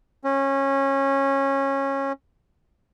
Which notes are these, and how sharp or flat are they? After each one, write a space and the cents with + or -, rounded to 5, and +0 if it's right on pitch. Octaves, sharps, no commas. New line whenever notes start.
C#4 -20